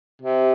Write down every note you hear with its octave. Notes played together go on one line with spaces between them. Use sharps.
C3